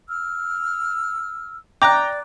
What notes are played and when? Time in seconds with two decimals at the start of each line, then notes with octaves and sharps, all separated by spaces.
0.08 E6 F6
1.82 D5 G5 A#5 D6 F#6